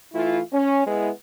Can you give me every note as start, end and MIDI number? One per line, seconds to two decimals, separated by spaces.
0.13 0.39 52
0.13 0.39 57
0.13 0.39 64
0.13 0.39 65
0.52 0.84 61
0.86 1.09 56
0.86 1.09 59
0.86 1.09 64